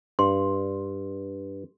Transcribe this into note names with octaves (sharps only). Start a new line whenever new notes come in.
G2 C6